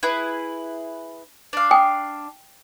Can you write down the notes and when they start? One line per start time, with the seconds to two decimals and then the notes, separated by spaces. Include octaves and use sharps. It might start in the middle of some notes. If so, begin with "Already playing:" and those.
0.03 E4 G#4 B4
1.53 D4 F5
1.71 G5 G#5 D#6